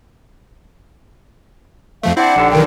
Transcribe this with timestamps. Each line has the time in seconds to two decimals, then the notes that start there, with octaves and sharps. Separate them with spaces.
2.03 F2 F3 A3 F5
2.17 C4 D4 E4 F#5
2.36 A#1 D#2 D3
2.52 B1 D#3 E3 A#4 G5